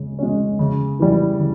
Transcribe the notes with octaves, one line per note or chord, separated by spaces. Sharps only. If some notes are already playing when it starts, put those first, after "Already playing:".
Already playing: C#3 G#3 C#4
G#3 C#4
C#3
E3 G3
C#3